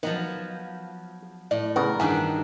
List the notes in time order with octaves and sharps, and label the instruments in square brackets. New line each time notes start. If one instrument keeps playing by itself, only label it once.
[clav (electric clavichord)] D#3 [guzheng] F3 F#3 B3
[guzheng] A2 [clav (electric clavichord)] D5
[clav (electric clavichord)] A2 C#3 B3 [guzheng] A#4
[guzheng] G2 D#3 D4 [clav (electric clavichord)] E3 B3 G#4